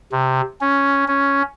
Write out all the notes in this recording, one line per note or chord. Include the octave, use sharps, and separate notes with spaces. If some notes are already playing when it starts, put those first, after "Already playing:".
C3
C#4
C#4